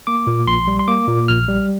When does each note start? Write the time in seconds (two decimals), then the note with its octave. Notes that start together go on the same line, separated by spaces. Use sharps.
0.07 A#3 D6
0.27 A#2
0.47 A#1 C6
0.68 G3
0.79 C6
0.88 A#3 D6
1.08 A#2
1.28 A#1 F6
1.48 G3